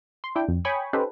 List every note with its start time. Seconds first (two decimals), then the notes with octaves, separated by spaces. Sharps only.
0.24 C6
0.35 D4 E4 G5
0.48 F2
0.65 C#5 G5 G#5 B5 C#6 D#6
0.93 C#4 D#4 G4 A4 B4 C5